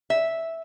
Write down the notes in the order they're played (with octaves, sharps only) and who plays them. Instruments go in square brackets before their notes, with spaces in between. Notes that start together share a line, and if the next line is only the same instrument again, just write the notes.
[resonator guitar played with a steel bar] E5